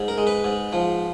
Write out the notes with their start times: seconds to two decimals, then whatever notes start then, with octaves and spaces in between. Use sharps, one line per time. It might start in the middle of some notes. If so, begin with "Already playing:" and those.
Already playing: G#2
0.08 A#4
0.18 G#3
0.27 B4
0.44 G#2
0.72 F3